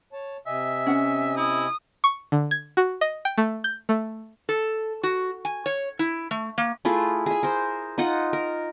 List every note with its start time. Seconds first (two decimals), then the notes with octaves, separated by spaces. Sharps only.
0.13 C#5 A5
0.47 C3 D#5 E5 G#5
0.86 C#4 F#5
1.37 E4 D#6
2.04 C#6
2.32 D3
2.51 G#6
2.77 F#4
3.01 D#5
3.25 G5
3.38 A3
3.64 G6
3.89 A3
4.49 A4
5.03 F#4
5.45 G#5
5.66 C#5
5.99 E4
6.31 A3
6.58 A#3
6.85 A3 E4 F4 G#4
7.26 G#4 E5
7.43 A#4 C5
7.98 D#4 F4 D#5 F#5
8.33 A#4